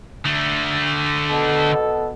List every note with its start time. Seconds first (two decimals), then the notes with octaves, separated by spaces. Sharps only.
0.25 D3 A3
1.29 B2 A4